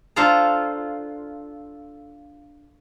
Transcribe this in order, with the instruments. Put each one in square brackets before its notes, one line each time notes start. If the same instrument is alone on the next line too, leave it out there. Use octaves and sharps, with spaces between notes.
[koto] D4 F4 A4 C5 F5 A#5